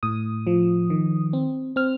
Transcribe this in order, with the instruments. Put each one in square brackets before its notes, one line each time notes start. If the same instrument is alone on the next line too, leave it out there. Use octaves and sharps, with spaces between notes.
[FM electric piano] A2 D#6
F3
D#3
C4
C4 F6